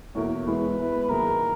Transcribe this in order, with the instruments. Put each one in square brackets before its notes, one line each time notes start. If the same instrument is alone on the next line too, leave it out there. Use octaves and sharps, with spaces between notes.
[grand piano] E2 B2 A#3 E4 A#4 [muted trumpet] C#5
[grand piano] E3 G#3 B3 E4 [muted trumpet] B4
[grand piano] G#3 B3 E4
[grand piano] F#2 D#3 A#3 E4 G#4 [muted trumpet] A#4